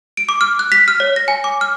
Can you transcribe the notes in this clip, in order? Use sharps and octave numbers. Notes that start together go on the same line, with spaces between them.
D7
D6
F6
F#6
B6
F6
C#5
A#6
G#5
D6
F6